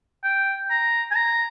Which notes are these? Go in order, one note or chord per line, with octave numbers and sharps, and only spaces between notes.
G5
A#5
G#5
A#5